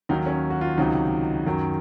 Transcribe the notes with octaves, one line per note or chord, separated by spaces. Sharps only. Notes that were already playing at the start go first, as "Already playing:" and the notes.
D#2 D#3 F#3 D#4
C#4
F#4
F4
C#2 C3 D#3 F#3 D#4
F#2 D#3 F#3